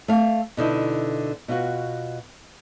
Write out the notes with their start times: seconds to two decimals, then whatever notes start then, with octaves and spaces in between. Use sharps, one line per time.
0.08 A3 F5
0.57 B2 D3 D#4 E4
1.48 B2 F4 F#4